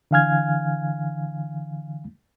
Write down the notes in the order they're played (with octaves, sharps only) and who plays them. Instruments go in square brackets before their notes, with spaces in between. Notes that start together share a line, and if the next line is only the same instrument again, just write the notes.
[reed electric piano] D3 E3 F5 G#5 F6 G#6